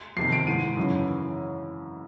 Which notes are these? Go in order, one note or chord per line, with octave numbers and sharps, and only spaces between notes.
F2 C3 D#3 C7
D7
G#2 E3 D#7
F#2 C#3 E3